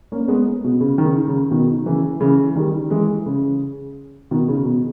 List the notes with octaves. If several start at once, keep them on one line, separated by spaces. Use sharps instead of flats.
A#3 C#4
G#3 B3
B2
C#3
D#3
C#3
C#3
B2 D#3
C#3 E3
C#3 E3
D#3 G3
E3 G#3
C#3
B2 D#3
C#3
B2